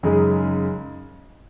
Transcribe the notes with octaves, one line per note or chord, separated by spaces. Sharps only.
F#2 C#3 G#3 D#4 G#4